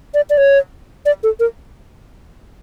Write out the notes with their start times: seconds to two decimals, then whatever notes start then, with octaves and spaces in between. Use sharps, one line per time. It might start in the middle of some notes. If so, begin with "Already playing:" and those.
0.14 D5
0.30 D5
0.38 C#5
1.06 D5
1.23 A4
1.40 A#4